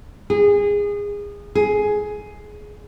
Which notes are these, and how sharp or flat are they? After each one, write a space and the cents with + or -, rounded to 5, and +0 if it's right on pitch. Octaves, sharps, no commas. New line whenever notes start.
G#4 -25
G#4 +10